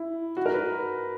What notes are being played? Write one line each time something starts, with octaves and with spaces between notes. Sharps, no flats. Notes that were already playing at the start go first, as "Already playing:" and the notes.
Already playing: E4
F#4
A#4
B4